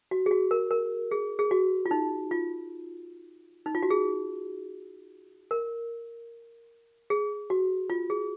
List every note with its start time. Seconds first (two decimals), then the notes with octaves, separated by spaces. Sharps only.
0.11 F#4
0.26 G#4
0.31 F#4
0.51 A#4
0.71 A#4
1.11 G#4
1.39 G#4
1.51 F#4
1.86 F4
1.91 D#4
2.31 F4
3.66 D#4
3.75 F4
3.83 F#4
3.90 G#4
5.51 A#4
7.10 G#4
7.50 F#4
7.90 F4
8.10 G#4